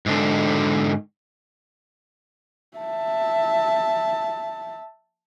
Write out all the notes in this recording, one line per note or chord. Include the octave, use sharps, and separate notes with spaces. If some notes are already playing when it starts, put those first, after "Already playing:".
G#2 D3
E5 A5